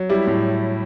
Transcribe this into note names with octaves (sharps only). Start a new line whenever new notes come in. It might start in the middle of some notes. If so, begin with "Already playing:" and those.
Already playing: F#3
G3 E4 G4
A2